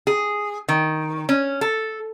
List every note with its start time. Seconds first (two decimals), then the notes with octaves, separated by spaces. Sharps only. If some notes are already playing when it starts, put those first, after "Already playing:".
0.07 G#4
0.68 D#3
1.29 C#4
1.61 A4